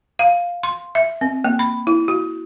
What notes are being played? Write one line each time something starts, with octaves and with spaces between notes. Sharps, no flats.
F5
C6
E5
C4
A#3
B5
E4
F#4